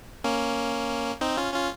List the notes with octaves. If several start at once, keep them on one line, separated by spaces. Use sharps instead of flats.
A#3 C#4
C4 D#4
C#4 F4
C#4 F4